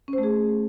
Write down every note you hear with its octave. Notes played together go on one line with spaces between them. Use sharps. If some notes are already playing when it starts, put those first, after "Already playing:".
C#4
C5
A3
G#4